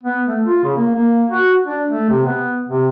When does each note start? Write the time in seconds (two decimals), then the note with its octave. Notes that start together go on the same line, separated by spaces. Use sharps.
0.03 B3
0.27 A3
0.45 F4
0.64 C#3
0.77 A#3
0.95 A#3
1.31 F#4
1.66 D4
1.89 A3
2.10 C3
2.26 B3
2.69 C3